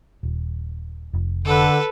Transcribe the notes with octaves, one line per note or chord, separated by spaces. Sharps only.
D#1
F1
D3 A4 B4